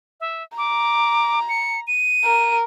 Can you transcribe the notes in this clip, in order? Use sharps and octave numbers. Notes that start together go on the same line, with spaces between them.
E5
A#5 D6
C#7
D#7
A#4